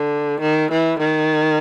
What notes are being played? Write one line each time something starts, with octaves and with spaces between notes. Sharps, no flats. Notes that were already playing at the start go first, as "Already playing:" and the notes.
Already playing: D3
D#3
E3
D#3